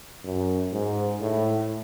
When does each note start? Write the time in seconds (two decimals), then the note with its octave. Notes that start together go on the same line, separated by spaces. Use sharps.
0.24 F#2
0.72 G#2
1.21 A2